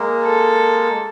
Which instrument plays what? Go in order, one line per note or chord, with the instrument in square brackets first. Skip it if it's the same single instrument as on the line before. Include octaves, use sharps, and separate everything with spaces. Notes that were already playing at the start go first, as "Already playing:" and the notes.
Already playing: [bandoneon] G#3 A#3
[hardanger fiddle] A4